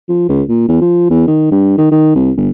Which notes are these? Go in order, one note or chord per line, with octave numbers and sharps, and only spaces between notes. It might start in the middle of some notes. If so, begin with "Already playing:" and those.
F3
C#2
A#2
E2
F3
E2
D#3
G2
D#3
D#3
C2
G1